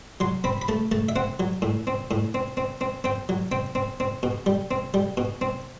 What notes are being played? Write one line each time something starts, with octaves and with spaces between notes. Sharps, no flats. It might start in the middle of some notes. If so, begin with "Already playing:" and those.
F#3 C6
C4 B5
B5
A3 A5
A3 A5
E5
C4 F#5
F#3
A2
C4
A2
C4
C4
C4
C4 G5
F#3
C4 G5
C4
C4
B2
G3
C4
G3
B2
C4